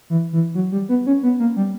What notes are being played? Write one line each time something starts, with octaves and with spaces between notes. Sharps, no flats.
E3
E3
F#3
G3
B3
C#4
B3
A#3
G3